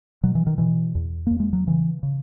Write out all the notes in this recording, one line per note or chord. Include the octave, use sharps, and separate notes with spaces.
B2 F#3
E3
D#3
B2 E3
E2
E2 A#3
G#3
F#3
C#3 E3
C#3